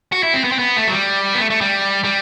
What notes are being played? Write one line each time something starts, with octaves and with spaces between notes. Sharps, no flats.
F#4
E4
C4
B3
C4
B3
A3
F#3
G3
B3
A3
A3
G3
G3